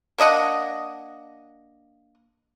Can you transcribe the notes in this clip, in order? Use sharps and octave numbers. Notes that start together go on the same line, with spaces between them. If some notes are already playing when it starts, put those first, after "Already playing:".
A#3 D4 D#5 F#5